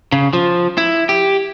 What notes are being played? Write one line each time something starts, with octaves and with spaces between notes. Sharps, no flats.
C#3
F3
E4
G4